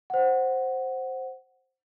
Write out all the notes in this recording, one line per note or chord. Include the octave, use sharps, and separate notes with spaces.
C5 F#5